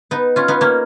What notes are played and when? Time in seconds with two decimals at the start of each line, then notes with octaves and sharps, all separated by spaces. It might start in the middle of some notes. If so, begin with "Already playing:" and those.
0.11 B3 D#4
0.36 C#4 F4
0.48 B3 D#4
0.61 A#3 C#4